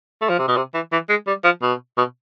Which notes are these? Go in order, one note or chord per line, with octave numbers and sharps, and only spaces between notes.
A3
F3
C3
B2
C3
E3
E3
G#3
G3
F3
B2
B2